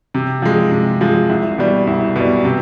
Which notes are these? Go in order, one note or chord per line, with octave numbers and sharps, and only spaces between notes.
C3
F3 G#3
C3
F3 G#3
C2
B2 G3
C2
B2 G3
C3